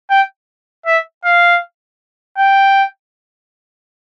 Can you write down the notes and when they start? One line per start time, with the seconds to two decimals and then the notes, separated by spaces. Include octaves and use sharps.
0.10 G5
0.86 E5
1.25 F5
2.38 G5